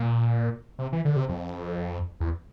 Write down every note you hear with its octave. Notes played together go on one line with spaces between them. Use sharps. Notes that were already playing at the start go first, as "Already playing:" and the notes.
Already playing: A#2
C3
E3
D3
C3
F2
E2